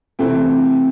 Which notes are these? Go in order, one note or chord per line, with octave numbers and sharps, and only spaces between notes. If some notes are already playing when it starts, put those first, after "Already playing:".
C3 E3 A3 C4 G5